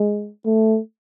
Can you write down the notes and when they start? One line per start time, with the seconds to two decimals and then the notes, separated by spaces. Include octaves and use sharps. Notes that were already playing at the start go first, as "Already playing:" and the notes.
Already playing: G#3
0.46 A3